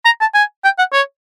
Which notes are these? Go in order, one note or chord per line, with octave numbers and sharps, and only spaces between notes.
A#5
A5
G#5
G5
F#5
C#5